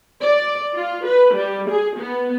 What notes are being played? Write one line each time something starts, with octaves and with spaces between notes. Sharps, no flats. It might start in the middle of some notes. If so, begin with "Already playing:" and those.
D5
F4
B4
G3
G#4
B3